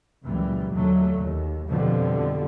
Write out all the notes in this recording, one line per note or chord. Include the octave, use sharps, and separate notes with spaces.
C#2 F#2 A#2 E3 G3
D#2 D3 F#3 A3
D#2
F2 B2 D3 F3 G3